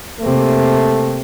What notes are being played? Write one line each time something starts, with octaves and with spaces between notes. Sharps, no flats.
C3 A3 A#3